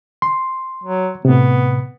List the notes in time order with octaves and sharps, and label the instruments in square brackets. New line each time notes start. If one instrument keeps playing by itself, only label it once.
[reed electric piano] C6
[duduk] F#3
[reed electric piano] A2 C3 [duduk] B3